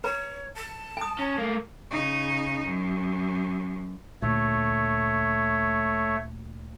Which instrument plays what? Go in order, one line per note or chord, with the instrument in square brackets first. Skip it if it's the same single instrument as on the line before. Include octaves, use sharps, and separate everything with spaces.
[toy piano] B4 A#5 [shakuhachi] C#5
[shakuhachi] A5
[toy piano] G#5 D#6
[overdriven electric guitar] C#4
A3 A#3
[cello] C#3 D#4
F#2
[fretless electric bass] D2 A#2 [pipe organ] A3 C#5